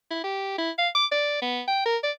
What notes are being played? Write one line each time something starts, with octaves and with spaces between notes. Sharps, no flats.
E4
G4
E4
F5
D6
D5
B3
G5
A#4
D5